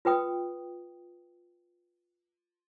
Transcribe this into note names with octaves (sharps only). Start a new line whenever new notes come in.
F4 B4 G5 D#6